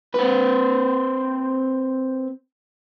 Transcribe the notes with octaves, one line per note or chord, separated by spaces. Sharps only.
C4 B4